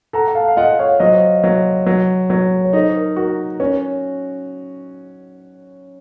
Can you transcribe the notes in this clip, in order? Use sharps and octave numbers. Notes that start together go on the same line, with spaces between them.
A4 F#5 A#5
F#5
F5 A5
F5
F4 D#5 F#5
C#5 F5
F#3 C5 D#5
F#3
F#3
F#3
C#5
D#4 A4 C5
A#4
F#4 A#4
C#4 A#4 C#5